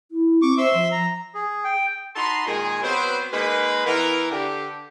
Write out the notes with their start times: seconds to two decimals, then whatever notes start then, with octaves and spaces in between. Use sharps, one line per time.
0.12 E4
0.42 C4 C#6 D6
0.58 C5 E5 C6 E6
0.74 F3
0.92 A#5
1.35 G#4
1.64 G5
2.16 D#4 F#4 A5 B5 C6
2.47 A#2 D#3 G#3 G#4
2.83 F#3 B3 C4 B4 C5
3.33 G#3 A#3 D#4 B4
3.86 E3 B3 A#4
4.30 D3 G4